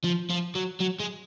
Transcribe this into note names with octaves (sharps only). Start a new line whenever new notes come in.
F3
F3
F#3
F#3
G#3